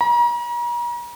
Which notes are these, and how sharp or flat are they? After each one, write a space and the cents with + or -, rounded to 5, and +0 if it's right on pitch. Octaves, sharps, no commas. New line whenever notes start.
A#5 +40